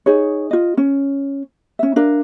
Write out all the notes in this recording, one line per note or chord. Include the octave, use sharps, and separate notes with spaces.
D#4 G#4 C#5
F4 D#5
C#4
C#4 E5
D4 A#4 F5